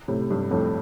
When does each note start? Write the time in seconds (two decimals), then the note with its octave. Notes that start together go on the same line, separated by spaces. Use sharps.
0.08 A2 C3
0.30 G2
0.51 F2 A2